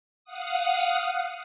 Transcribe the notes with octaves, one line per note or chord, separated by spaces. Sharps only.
F5 F#5 D#6